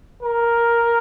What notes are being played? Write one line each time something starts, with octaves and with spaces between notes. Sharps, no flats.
A#4